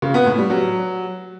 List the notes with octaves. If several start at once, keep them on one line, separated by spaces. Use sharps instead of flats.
C#3
B3
A2
G3
F#3